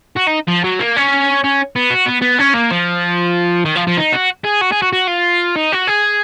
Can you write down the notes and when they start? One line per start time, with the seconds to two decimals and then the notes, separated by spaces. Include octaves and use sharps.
0.16 F#4
0.27 D#4
0.47 F3
0.64 F#3
0.79 A#3
0.96 C#4
1.44 C#4
1.76 B3
1.90 F#4
2.06 B3
2.22 B3
2.39 C#4
2.54 A#3
2.71 F3
3.65 D#3
3.76 F3
3.87 F3
3.98 D#4
4.12 F#4
4.44 G#4
4.61 F#4
4.72 G#4
4.82 F#4
4.93 F#4
5.08 F4
5.56 D#4
5.72 F#4
5.87 G#4